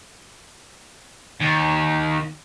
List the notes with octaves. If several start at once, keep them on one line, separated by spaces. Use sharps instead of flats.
D#2